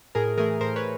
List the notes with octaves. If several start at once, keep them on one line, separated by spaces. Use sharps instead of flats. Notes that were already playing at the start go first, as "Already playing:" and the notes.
A2 G#4 A#4
E3 A3 G#4 A#4
A2 A#4 C5
B4 C#5